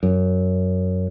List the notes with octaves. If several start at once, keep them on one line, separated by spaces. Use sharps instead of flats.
F#2